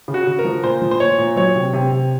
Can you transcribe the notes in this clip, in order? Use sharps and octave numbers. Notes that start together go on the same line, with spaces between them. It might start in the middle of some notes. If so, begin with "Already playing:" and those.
C#3
F#4
C#3
A#4
F3
A#2 C5
F3
C5
A#2 C#5
A#2
F#3 C#5
C3
C3
C3